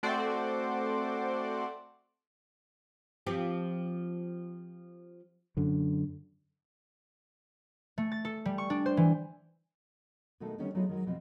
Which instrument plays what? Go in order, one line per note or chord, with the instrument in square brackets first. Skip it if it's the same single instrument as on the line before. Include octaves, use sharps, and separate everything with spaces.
[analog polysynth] A3 C4 F#4 C5 D5
[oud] F3 C4 G4
[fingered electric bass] F#2 D3
[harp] A3
A6
A4
G3
C#6
D4
C5
E3
[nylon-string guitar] B2 D#3 G#3 A3 A4
D3 D#3 G3 B3 C#4 D4
F#3 A3 B3 D#4 F4 G#4
D#3 F#3 G#3
B2 F3 C4